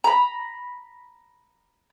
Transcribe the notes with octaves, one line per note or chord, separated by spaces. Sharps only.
A#5 B5